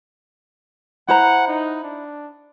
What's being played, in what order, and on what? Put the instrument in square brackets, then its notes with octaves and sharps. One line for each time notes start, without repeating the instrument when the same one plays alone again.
[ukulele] E4 C5 A#5 [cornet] F#5
[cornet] D#4
D4